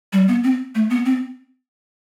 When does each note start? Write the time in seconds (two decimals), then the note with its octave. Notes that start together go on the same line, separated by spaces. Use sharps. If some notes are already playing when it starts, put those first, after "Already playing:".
0.13 G3
0.28 B3
0.44 C4
0.75 A3
0.90 B3
1.06 C4